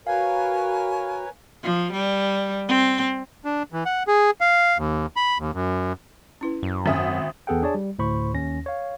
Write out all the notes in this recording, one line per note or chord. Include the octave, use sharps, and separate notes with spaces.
F#4 A#4 B4 C#5 F5 G#5
F3
G3
C4
D4
E3
F#5
G#4
F5
D#2
B5
D#2
F#2
C#4 E4 B4
F#2
G#1 C#4 E5 D#6
E2 B3 G#4 A4 F#5 G5
D4 G#4 C#5 D5 A5
G3
D2 A2 C5 B5 C#6
D#2 C#4 A#6
C#5 F5